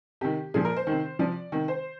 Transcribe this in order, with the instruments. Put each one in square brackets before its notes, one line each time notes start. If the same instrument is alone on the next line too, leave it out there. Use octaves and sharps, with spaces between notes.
[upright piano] C3 D#3 G4
A#2 F3 G#4
A#4
C5
C3 D#3
C3 F3 D5
C3 D#3
C5